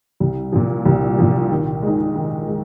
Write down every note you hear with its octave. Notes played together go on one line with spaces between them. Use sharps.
C2
A#2 F3
C2
A#2 F3
D#3
G#3 D#4
D#3
G#3